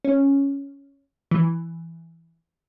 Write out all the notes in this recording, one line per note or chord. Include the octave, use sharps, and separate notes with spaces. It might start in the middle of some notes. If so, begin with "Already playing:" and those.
C#4
E3